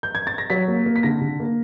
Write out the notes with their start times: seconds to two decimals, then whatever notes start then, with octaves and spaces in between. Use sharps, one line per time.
0.03 G6
0.15 G#6
0.27 A6
0.38 A#6
0.50 F#3 B6
0.68 A#3
0.86 A#3
0.96 B6
1.03 D3 A#6
1.21 D3
1.40 A#3